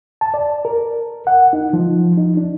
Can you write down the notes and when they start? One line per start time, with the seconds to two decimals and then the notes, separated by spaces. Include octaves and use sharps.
0.21 A5
0.34 D5
0.65 A#4
1.27 F#5
1.53 D#4
1.73 F3
2.18 D#4
2.37 D4